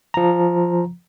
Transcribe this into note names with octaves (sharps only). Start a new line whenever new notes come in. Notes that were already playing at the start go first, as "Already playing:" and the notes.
F3 A#5